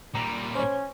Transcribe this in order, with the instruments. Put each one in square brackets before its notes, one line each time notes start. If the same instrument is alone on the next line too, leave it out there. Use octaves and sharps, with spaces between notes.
[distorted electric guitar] A#2 G3 [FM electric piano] A#5
[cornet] C#4 [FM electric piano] C5 C#5